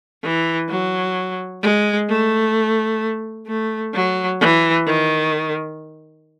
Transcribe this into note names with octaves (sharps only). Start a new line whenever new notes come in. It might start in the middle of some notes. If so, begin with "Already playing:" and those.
E3
F#3
G#3
A3
A3
F#3
E3
D#3